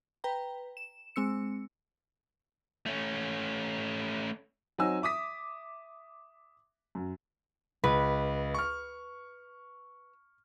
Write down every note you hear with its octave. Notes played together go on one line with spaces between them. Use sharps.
B4 G5 A#5
E7
G#3 C4 E6 C#7
A3 C#4
F#3 C4 D#4 G#5 E6
E5 D6 D#6 B6
F#2
C#2 B4
C#6 F6